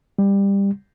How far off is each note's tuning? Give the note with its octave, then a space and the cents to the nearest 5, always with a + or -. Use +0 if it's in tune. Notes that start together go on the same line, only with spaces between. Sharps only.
G3 +20